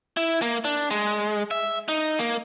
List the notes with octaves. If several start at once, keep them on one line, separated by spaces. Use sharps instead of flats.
E4
A#3
D4
G#3
E5
D#4
A#3